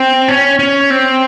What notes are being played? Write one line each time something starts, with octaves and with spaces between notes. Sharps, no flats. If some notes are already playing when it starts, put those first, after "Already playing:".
Already playing: C4
C#4
C#4
C4